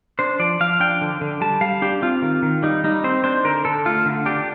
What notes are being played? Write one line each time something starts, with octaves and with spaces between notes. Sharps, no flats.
D4 C5
F3 D5
F3 F5
D4 G5
D3
D3
G3 A5
G3 F5
D4 G4
C4 F4
D#3
D#3
G3 D#4
G3 D#4
C4 C5
D4 C5
D3 A#4
D3 A4
A3 F4
D3
D4 G4